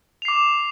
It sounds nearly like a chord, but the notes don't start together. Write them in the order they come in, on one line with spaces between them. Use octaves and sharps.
F7 C7 D6